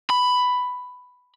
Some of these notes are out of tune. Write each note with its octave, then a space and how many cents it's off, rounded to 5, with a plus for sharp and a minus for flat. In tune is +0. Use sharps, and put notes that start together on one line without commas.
B5 +10